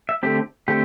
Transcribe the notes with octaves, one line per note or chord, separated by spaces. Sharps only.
E5
D3 A3 C4 G4
D3 A3 C4 G4